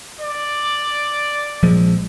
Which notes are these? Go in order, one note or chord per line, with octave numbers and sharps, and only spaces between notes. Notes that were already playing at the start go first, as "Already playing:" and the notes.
D5
A#1 F3 G#3